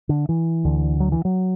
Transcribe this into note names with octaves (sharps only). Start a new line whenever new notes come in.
D3
E3
D2 D3
F#3
E3
F#3